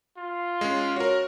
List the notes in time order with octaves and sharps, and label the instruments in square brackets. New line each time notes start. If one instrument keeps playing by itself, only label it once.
[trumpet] F4
[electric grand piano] G#3 C#4
[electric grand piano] F#4 A#4 [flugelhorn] C#5